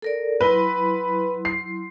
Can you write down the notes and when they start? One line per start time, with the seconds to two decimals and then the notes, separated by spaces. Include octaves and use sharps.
0.02 A4 A#4 D5
0.41 F#3 E4 B4 C6
1.45 C7